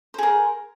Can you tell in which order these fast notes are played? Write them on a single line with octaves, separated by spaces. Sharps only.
C5 G#4 A#4